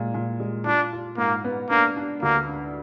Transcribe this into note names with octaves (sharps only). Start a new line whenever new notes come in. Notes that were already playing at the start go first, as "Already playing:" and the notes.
Already playing: A#2 G#3
A#2
G#3
D4 F4
F4
G#2 A#3
B3
A#3 D4
D4
D2 A#3
D4